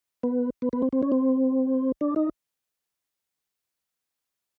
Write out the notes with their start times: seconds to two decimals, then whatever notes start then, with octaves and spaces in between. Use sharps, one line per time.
0.23 B3
0.62 B3
0.73 B3
0.82 C4
0.93 C4
1.03 C#4
1.12 C4
2.01 D4
2.16 D#4